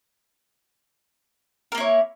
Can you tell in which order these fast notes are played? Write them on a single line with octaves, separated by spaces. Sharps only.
A#4 A#3 E4 C#5